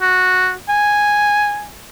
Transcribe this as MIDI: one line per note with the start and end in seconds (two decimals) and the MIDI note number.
0.01 0.53 66
0.69 1.67 80